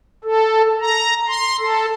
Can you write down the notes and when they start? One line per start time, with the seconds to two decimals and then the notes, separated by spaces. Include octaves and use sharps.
0.24 A4
0.81 A#5
1.28 C6
1.59 A4